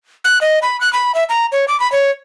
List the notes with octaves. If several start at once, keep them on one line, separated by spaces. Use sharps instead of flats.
F#6
D#5
B5
F#6
B5
E5
A#5
C#5
D6
B5
C#5